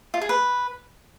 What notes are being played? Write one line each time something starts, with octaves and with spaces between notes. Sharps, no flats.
F4
G#4
B4